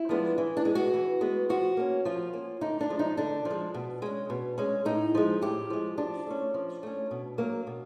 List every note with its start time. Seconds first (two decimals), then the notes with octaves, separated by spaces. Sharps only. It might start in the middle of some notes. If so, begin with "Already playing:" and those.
Already playing: E4
0.09 F3 G#3 B3 D4
0.38 E3
0.57 D4
0.65 G#3 B3
0.75 F#4
0.94 E3
1.21 G#3 B3
1.49 F3 F#4
1.77 A#3 C#4
2.05 F3 F4
2.33 A#3 C#4
2.61 D3 D#4
2.81 D4
2.90 F3 G#3
2.99 D#4
3.17 D3 D4
3.45 F3
3.50 G#3
3.74 B2
4.02 G#3 C#4
4.30 B2
4.58 G#3 C#4
4.85 A2 D#4
5.15 F3 G#3
5.42 A2 G4
5.70 F3 G#3
5.98 F3 D4
6.27 A3 C#4
6.54 F3
6.83 A3 C#4
7.11 B2
7.38 F#3 A#3
7.67 B2